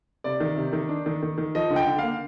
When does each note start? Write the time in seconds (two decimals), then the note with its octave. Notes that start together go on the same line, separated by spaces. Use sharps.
0.24 C3 D5
0.40 D#3
0.56 C3
0.73 D#3
0.89 D4
1.06 D#3
1.23 D#3
1.38 D#3
1.55 F3 D#5
1.70 D3
1.76 G5
1.87 D3
1.98 A#3 F5